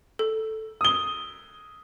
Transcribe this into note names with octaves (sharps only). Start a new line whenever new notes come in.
A4
D#6 G7